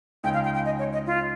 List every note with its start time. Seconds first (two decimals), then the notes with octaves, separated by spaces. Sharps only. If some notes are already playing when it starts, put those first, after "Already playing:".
0.24 C#2 C#3 G#3 D#4 G5
0.34 F5
0.45 G5
0.55 G5
0.66 D#5
0.79 C#5
0.93 D#5
1.07 F4